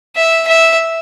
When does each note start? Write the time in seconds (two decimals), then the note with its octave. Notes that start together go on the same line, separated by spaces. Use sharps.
0.16 E5
0.47 E5